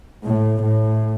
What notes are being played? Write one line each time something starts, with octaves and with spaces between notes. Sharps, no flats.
A2
A2